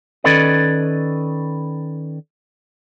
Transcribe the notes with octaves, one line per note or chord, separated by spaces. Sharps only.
D#3 C#4 A4 B4 D5 D#5